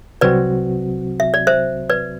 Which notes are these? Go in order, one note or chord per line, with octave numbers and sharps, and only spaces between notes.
C2 C3 F#3 C4 F#4 B4 D5
E5
D5
C5 E5
B4 D5